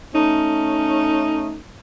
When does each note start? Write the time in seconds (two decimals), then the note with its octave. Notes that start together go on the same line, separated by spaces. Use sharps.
0.14 A3 C#4 D#4